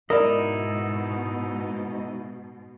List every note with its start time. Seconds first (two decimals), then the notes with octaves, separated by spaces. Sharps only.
0.10 G#2 B2 D#4 E4 A#4 D5 D#5